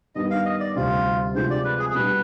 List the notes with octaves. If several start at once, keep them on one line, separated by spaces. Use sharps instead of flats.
G2 D#3 B3 D#5
F5
D#5
D5
D2 C3 G3 C4 F4
C3 F3 G#3 C4 C5
D5
B4
G#4
G#4
B2 G3 B3 D4 B4